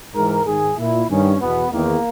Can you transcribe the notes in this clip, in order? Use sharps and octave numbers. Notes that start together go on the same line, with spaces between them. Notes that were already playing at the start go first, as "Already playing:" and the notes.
G#2 E3 A#4
G#2 D#3 G#4
A#2 E4
G2 D#3 C#4
E2 B2 B3
E2 D#3 A#3